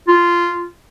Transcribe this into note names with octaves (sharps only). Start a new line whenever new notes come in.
F4